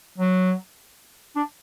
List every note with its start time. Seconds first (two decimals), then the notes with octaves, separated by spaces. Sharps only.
0.18 F#3
1.36 D4